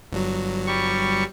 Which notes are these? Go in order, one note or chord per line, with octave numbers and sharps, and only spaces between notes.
G1 G2 F#3
G3 C#6